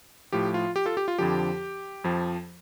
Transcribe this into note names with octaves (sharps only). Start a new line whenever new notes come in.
A2 F3 G4
F4
G4
F4 A4
G4
F4
F2 D3 F3 G4
F2 F3